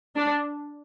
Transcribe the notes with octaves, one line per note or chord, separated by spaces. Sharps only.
D4